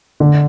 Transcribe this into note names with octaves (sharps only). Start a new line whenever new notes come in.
D3